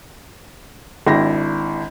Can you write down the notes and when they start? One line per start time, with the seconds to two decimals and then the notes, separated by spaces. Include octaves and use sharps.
1.07 G#1 D4 E4 G5 A#6